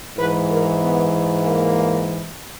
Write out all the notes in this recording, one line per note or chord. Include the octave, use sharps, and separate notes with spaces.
G#2 E3 B4
A#4
B3
A#3